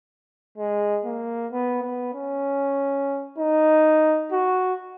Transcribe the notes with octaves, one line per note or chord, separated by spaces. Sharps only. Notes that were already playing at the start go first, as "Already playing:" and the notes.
G#3
A#3
B3
B3
C#4
D#4
F#4